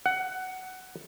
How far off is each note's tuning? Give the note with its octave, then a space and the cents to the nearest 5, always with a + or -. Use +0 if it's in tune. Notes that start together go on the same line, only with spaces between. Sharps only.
F#5 +15